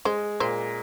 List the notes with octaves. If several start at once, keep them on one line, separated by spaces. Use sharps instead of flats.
G#3 C5
A#2 C5